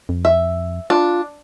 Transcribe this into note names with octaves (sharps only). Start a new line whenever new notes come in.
F2
E5
D4 F4